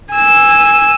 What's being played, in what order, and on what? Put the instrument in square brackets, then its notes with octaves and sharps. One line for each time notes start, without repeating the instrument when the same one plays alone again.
[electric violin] G#5 E6